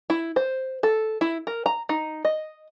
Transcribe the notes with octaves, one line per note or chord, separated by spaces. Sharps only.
E4
C5
A4
E4
A#4
A#5
D#4
D#5